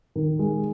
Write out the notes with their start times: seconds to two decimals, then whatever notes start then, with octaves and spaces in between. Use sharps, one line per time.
0.16 D#3
0.39 G#3